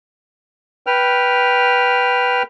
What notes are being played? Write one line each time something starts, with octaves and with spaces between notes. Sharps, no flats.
B4 G5 F6